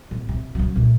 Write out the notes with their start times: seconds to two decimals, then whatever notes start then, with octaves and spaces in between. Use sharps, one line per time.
0.11 D1
0.29 C3
0.55 C#3 F#3
0.76 A#2 A3